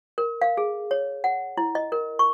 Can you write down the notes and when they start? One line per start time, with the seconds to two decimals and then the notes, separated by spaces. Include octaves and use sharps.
0.18 A#4
0.42 F5
0.57 G#4
0.91 C#5
1.24 F#5
1.58 E4
1.75 D#5
1.92 A#4
2.19 C#6